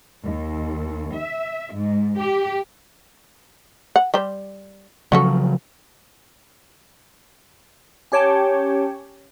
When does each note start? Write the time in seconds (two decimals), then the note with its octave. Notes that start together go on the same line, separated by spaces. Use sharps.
0.24 D#2
1.14 E5
1.73 G#2
2.19 G4
3.96 F#5
4.14 G3 G4 C5
5.12 C#3 F3 F#3 C#4 F#4 A4
8.12 C#4 G4 C#5 G5 A5